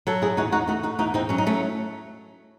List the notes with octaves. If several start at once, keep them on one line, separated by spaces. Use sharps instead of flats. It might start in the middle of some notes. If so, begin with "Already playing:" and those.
F#3 F#4 A4
E4 G#4
E2 D#4 F#4
D#4 F#4
A3 D#4 F#4
D#4 F#4
E2 D#4 F#4
C4 D#4
F#3 C#4
D#4
A3 C#4